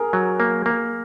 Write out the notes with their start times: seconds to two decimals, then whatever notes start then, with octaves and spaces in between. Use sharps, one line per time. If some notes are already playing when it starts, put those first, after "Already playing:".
Already playing: G#4 A#4
0.13 F#3
0.40 A#3
0.66 A#3